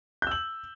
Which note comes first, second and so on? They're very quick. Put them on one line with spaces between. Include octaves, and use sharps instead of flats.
G6 E6 F#7